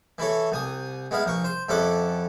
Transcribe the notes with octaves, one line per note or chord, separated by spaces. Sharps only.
E3 E4 A4 C#5
C2 G#5 D#6
G#3 B3 E4 F5
A#1 A#4 C#6
C5 C6
F2 C#4 E4 A4 F#5 D6